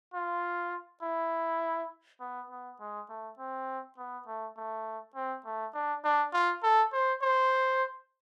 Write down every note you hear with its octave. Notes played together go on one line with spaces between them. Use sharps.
F4
E4
B3
B3
G#3
A3
C4
B3
A3
A3
C4
A3
D4
D4
F4
A4
C5
C5